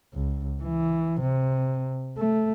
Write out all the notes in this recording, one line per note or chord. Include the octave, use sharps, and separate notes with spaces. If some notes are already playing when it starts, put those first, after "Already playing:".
C#2
E3
C3
A3